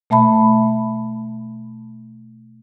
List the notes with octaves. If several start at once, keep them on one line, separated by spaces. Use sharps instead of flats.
B2 A3 E5 A5 B5